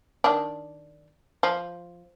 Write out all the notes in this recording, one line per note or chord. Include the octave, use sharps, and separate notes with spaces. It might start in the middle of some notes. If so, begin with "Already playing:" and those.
D#3 D4
F3